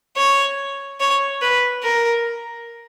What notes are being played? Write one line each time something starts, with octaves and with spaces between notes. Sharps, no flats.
C#5
C#5
B4
A#4